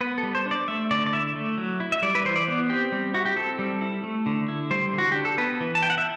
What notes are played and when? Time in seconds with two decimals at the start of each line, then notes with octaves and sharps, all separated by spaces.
0.01 B3 B4
0.18 A4
0.23 G3
0.35 C5
0.46 D4
0.51 D5
0.68 A3 E5
0.91 D3 D5
1.06 D5
1.13 E4 E5
1.36 A3
1.58 F#3
1.80 E4
1.92 E5
2.02 G3 D5
2.15 B4
2.25 E3 C5
2.36 D5
2.48 B3
2.69 C4 G4
2.92 G3
3.14 E4 F#4
3.25 G4
3.36 C4 A4
3.59 G3
3.81 E4
4.04 A3
4.26 D3
4.48 E4
4.71 G3 C5
4.93 D3
4.98 F#4
5.12 D4 G4
5.25 A4
5.38 B3 B4
5.61 E3
5.75 A5
5.82 E4 G5
5.90 F#5
5.98 E5